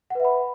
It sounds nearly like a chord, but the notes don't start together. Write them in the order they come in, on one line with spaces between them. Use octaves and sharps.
F#5 B4 E5 B5